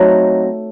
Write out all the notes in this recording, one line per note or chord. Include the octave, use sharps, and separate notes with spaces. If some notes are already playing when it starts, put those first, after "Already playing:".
Already playing: F#3 A3 C4 D#4